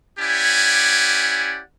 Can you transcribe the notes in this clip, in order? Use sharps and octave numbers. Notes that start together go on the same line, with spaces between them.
C#4 E4 G4 D5 F#5 G#5